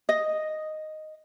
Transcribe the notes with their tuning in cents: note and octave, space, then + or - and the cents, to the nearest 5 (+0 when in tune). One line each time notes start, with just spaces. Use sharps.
D#5 -5